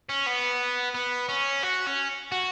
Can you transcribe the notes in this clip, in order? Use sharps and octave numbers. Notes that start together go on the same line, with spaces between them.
C#4
B3
B3
C#4
F#4
C#4
F#4